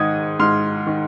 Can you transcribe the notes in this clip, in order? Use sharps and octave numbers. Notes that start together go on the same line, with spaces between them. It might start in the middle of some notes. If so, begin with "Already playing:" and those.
Already playing: G#2 D#3 D#6 G#6
G#2 C6 F6
D#3